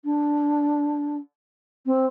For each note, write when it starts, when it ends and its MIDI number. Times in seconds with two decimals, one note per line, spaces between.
0.05 1.17 62
1.86 2.06 60